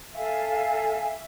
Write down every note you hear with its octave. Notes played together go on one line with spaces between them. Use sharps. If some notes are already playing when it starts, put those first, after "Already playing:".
A4 E5 F5 G#5